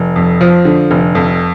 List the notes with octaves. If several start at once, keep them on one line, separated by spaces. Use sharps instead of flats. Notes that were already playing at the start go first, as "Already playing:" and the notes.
Already playing: F1
F2
F3
D3
F1
F2